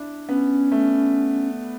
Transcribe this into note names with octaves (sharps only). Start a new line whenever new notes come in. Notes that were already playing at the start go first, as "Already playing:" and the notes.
Already playing: D4 E4
B3 C#4
A3